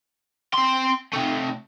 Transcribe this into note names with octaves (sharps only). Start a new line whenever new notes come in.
C4 C6
C3 A3